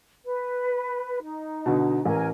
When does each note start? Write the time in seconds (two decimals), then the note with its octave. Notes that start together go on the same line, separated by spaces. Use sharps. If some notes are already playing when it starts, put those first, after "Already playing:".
0.25 B4
1.22 D#4
1.66 B2 D3
2.05 A1 A#4 G#5